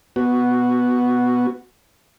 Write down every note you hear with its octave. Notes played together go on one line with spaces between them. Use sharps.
B3 F#4